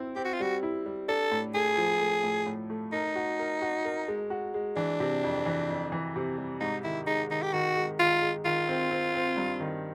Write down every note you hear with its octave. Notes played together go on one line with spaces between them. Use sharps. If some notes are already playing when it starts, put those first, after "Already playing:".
Already playing: C4 E4
C4 G4
F#4
F4
G3 F#4
E4
G3
D4 A4
A2
A3 G#4
F3
A3
A2
A2
A3
D#4 A#4
F#4
A#4
F#4
A#4
G#3
F#4
G#3
E3 D4
C3
F2
E3
F2
E3
C3
G3
G#2 D#4
D#3 E4
G#3 D#4
D#3 D#4
G4
D#3 F#4
G#3
D#3 F4
G#3
D#3 F4
C4
C4
C4
G2
D#3